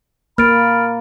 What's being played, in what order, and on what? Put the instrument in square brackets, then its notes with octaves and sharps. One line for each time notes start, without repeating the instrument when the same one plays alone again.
[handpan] A#3 [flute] B5 [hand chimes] F6 A6 D7